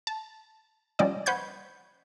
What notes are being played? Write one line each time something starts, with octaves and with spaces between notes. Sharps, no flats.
A5
F3 G3 C#4 D5 D#5
B4 C5 F#5 C#6 G6 G#6